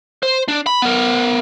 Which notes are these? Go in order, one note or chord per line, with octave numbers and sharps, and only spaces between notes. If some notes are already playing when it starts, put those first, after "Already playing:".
C5
D4
B5
B3 A#4